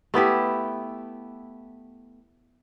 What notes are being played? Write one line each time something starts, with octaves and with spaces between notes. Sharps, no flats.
A3 B3 E4 G4